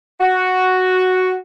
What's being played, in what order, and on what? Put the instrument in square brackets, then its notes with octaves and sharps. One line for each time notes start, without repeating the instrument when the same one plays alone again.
[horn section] F#4